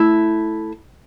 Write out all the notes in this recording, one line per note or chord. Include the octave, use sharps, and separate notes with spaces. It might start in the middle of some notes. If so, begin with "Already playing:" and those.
Already playing: A3 E4